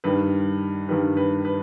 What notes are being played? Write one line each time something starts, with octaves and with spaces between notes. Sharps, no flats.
G2 D#3 G3 B4
G2 D#3 G3 B4
B4
B4